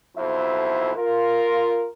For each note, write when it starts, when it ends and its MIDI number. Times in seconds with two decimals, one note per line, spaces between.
0.17 0.92 35
0.17 0.92 41
0.17 0.92 64
0.17 0.92 72
0.17 0.92 76
0.97 1.87 65
0.97 1.87 70